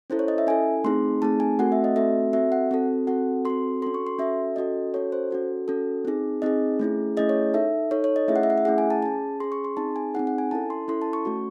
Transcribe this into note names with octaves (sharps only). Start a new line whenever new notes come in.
C#4 E4 A4 C5
C#5
D#5
E5
C#4 E4 A4 G#5
A3 C4 D#4 G#4 C6
A3 C4 D#4 G#4 A5
G#5
A3 C4 F#4 A4 F#5
E5
D#5
A3 C4 F#4 A4 E5
C4 F#4 A4 E5
F#5
C4 F#4 A4
C4 F#4 A4 F#5
C4 F#4 A4 C6
C#4 F#4 A4 C6
C#6
C6
C#4 F#4 A4 E5
C#4 F#4 A4 D#5
C#4 F#4 A4 C#5
C5
C#4 F#4 A4
C#4 F#4 A4
C4 D#4 G#4
C4 D#4 G#4 D#5
A3 C#4 E4 G#4
A3 C#4 E4 G#4 D#5
C#5
D#4 A4 E5
D#4 A4 C#5
C#5
D#5
A3 C#4 E4 G#4 E5
F#5
E5
F#5
E5
A3 C#4 E4 G#4 F#5
G#5
A5
C#4 G#4 A5
C#4 G#4 C6
C#6
C6
C4 D#4 G#4 A5
G#5
C4 D#4 G#4 F#5
F#5
G#5
C#4 E4 A4 A5
C6
C#4 E4 A4 C6
A5
C#6
A3 C#4 F#4